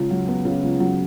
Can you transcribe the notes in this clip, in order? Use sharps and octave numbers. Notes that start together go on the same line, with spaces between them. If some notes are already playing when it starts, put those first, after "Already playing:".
Already playing: C#2 C#3
F#3
B3
C#3
C#2
F#3